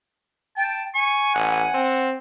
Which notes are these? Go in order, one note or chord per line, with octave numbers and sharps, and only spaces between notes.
G5 A5
G#5 C#6
A1 F#5
C4